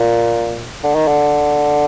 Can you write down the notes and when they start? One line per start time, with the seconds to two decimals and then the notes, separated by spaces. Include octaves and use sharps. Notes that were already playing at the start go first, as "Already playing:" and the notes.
Already playing: A#2
0.84 D3
0.95 D#3
1.07 D3